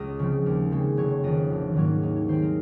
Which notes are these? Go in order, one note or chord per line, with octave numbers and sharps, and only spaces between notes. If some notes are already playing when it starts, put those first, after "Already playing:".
Already playing: C#2 D#5
C#3 F3 C4
D#2
C#3 G#3 C4
F1 C#5
F2 D#3 D#5
A#1
G#2 D#3 F#3 A#3 C#5
D#2 D#4
C#5
D#3 G#3 C4 C5
A#4